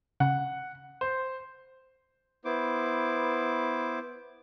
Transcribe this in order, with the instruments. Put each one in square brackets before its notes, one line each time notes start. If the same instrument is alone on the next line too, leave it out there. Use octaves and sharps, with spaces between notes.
[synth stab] C#3 [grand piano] F#5
[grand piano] C5
[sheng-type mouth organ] B3 E4 C5 D6